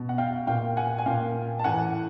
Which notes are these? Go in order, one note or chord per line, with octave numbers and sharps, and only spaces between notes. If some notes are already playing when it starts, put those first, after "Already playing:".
Already playing: B2
F#5
F5 G5
A#2 F5 G5
F#5 G#5
G#5
A#2 F5 G5
A5
A2 E3 F#5 G#5